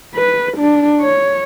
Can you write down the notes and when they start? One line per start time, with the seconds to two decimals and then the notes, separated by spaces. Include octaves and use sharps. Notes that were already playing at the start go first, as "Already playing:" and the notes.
0.15 B4
0.57 D4
1.01 C#5